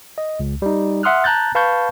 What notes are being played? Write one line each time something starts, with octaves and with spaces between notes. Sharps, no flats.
D#5
C#2
G3 D#4
E5 F#5 C6 D#6 F6 F#6
A5 A#5 F#6 G6 A6
B4 F5 A5 B5 C#6 G6